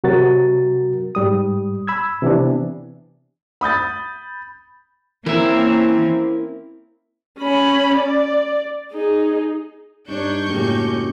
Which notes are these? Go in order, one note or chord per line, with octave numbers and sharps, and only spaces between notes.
C3 F#3 F#4 A#4 A6
G#2 G3 D#6
B5 E6 G#6
C3 E3 B3 D4
B5 D#6 G6 A6
E3 A#3 C4 C#4 E4 A#4 E5
C#4 B5
D5
D#4 G#4
G2 D4 D#4 C#5 C#6 G6
F#2 A2 C#3 G#3 A#3 D4 G4